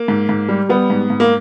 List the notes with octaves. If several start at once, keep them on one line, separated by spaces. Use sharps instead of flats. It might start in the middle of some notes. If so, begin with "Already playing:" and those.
Already playing: A#3
G#2
G#2
G3
G3 B3
G#2
G#2
A#3